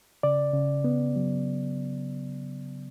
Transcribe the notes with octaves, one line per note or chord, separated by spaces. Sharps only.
C#3 D5
C#3
B3
F#3